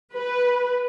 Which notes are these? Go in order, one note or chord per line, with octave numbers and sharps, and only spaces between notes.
B4